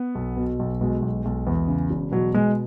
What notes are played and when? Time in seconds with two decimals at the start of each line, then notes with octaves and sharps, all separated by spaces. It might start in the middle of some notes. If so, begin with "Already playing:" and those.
Already playing: B3
0.15 B1
0.37 B2
0.59 B1
0.81 B2 G#3
1.02 B1
1.25 B1
1.47 E2
1.68 C#3
1.90 E1
2.11 B2 F#3
2.34 B2 G#3